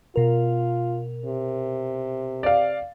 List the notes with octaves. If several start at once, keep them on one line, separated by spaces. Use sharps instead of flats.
B2 F4 A#4
C3
D5 F5